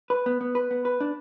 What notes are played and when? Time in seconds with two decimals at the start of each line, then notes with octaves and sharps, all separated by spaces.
0.10 B4
0.26 B3
0.41 B3
0.55 B4
0.71 B3
0.85 B4
1.00 D4